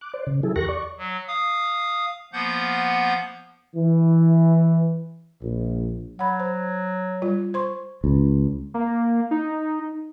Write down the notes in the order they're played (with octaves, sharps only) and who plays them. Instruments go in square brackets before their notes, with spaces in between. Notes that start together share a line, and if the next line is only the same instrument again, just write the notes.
[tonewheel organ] D6 F#6
C5 D5
C#3
F#3 E4 G#4 A4
E2 G4 A#4 C#6 F#6 A#6
D5 C#6
[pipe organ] F#3
F5 D#6
F3 A#3 B3 F#5 G6
[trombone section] E3
A#1
[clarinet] F#3 [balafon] F#5 B5
[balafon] C5
G3 F4
C5 C6 C#6
[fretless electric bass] C#2
[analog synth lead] A#3
D#4